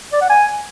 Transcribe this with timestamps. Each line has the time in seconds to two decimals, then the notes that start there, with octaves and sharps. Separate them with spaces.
0.13 D5
0.21 F#5
0.30 G#5